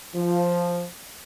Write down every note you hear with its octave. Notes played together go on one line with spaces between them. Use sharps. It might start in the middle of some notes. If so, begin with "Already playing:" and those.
F3